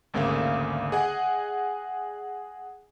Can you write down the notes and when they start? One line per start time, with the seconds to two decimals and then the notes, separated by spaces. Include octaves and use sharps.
0.14 G#1 D2 C#3 A#3 E5 F5
0.92 G#4 D#5 F#5 G#5